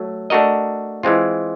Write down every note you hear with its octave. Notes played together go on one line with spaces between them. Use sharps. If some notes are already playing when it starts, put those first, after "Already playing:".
Already playing: F#3 A3
A3 D4 F#4 A#4 D#5
E3 G#3 C4 F4